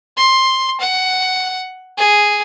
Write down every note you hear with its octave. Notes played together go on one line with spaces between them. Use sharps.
C6
F#5
G#4